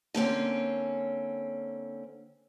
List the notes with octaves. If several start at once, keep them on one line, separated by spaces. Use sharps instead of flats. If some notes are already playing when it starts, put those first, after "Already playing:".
D3 A#3 C4 C#4